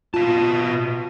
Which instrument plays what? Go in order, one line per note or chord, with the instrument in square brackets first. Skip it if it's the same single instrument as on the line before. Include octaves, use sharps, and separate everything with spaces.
[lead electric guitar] B2 A5 [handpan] F4